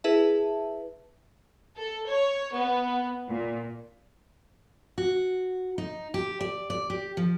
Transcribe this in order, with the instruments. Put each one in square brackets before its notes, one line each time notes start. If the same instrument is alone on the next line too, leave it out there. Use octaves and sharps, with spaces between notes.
[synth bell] E4 G#4 B4 E5 A5
[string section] A4
C#5
B3
A#2
[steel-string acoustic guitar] F#4
D#4
G4
D5
D5
G4
F3